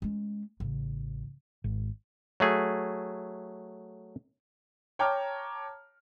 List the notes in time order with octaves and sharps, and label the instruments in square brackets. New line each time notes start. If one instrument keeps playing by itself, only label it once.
[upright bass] G#3 C#4
A1 C#3
[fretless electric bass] G#1
[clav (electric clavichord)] F#3 A3 G#4
[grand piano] C#5 G5 A5 A#5 D6 F6